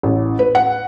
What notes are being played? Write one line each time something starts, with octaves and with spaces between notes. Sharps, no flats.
A1
B4
F#5